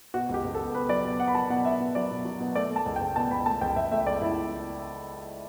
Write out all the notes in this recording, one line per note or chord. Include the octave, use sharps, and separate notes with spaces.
B2 F#4
C#2 G4
C#2
A4
B3
B3 B4
F#3 D5
B2
B3 F#5
B5
F#3 A5
B2 F#5
B3 E5
B2
F#3 D5
B2
F#3
B2
A3 D5
A3
A5
C#2
G5
C#2
B2 A5
C#2 B5
A3 A5
C#2 G5
C#2 E5
A3 E5
C#2 D5
C#2 E4